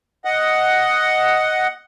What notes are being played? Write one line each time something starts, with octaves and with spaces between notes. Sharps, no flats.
D#5 F#5